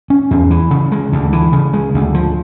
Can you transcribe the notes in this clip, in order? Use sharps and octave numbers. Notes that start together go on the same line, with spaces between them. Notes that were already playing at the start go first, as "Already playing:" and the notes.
C#4
E2
E3
C#3
G#3
D2
E3
C#3
G#3
D2
F3